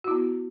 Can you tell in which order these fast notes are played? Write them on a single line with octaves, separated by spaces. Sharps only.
F#4 E4 B3